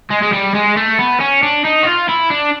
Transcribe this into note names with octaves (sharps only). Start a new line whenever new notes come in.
G#3
G#3
G3
G#3
A3
B3
C#4
D4
D#4
F#4
F4
E4
D4